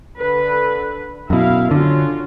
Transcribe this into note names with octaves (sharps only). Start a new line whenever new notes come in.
D3 B4
F#2 B2 E4 F5
D3 C#4 F4 F#4